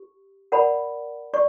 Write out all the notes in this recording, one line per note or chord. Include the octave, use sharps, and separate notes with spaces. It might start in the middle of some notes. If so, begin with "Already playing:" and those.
Already playing: G4
A#4 D5 F#5 B5
D5 C#6